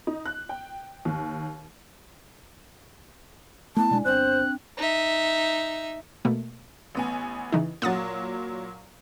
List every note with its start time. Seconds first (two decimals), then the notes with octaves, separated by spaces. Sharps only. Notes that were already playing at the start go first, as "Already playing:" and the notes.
0.07 D#4
0.25 F#6
0.49 G5
1.05 D#2
3.77 A3 B3 E4 A5
3.91 B2 G#3 D4 D5 G#5
4.05 G1 C4 D4 C5 G5 F#6
4.77 D#4 E5
6.25 B2 A3 A#3
6.95 A1 B3 G#5
7.52 C#3 E3 D#4
7.82 A#2 F#3 F#5 D#6 A6